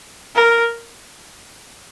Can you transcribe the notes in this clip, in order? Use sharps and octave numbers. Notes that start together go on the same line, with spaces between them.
A#4